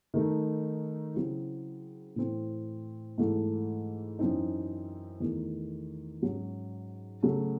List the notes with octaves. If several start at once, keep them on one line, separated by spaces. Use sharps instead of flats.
D#3 A3 D#4
C#3 F#3 C4 E4
A2 E3 C4
G#2 E3 A3
F#2 E3 C4 D#4
E2 D#3 A3
G#2 F#3 C#4
C#3 F#3 A3